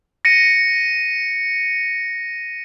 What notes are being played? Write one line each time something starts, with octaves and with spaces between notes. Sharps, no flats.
A#6 C#7 D#7